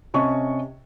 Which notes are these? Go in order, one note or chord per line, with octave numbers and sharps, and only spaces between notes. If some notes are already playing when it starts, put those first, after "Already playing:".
C3 C#4 D#5 A5 C#6